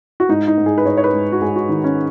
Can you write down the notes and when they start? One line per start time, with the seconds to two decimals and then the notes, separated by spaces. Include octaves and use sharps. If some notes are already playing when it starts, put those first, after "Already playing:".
0.20 F#4
0.29 G#2 D#4
0.47 D#4
0.58 G#2
0.66 G#4
0.78 B4
0.85 G#2 C#5
0.97 C#5
1.04 B4
1.13 G#2
1.32 F#4
1.41 G#2 G#4
1.56 F#4
1.69 D#3 D#4
1.84 C#4